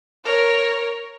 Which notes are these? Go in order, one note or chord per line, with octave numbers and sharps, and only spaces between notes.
A#4 C#5